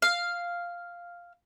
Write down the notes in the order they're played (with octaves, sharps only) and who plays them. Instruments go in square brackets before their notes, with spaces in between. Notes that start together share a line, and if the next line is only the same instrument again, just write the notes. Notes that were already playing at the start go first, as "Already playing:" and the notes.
[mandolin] F5